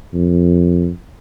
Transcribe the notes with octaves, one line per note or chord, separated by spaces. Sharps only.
F2